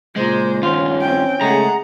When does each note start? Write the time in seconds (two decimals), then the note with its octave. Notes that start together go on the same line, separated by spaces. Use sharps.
0.16 C#2 A#2 G#3 C5
0.63 G2 D#3 C#4 F4
1.01 C4 G5
1.41 C#3 G#3 A3 G#4 F#5 A#5